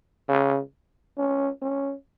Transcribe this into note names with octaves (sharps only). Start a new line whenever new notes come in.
C#3
C#4
C#4